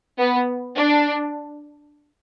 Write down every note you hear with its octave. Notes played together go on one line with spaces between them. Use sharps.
B3
D4